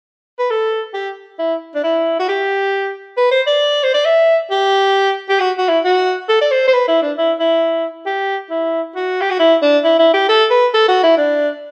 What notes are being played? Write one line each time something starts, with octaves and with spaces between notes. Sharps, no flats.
B4
A4
G4
E4
D4
E4
F#4
G4
B4
C5
D5
C5
D5
E5
G4
G4
F#4
F#4
E4
F#4
A4
D5
C5
C5
B4
E4
D4
E4
E4
G4
E4
F#4
G4
F#4
E4
D4
E4
E4
G4
A4
B4
A4
F#4
E4
D4